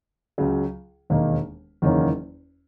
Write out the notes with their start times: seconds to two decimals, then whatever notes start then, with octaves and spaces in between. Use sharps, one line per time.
0.38 C#2 C#3 F#3
1.10 E1 D#2 D#3 A#3 D#4
1.82 F#1 E2 D#3 A#3 C#4